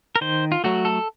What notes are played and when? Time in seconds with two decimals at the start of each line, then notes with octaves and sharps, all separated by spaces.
0.16 A#4
0.21 D#3 C5
0.52 F4
0.64 F#3 A3 F#4
0.85 A4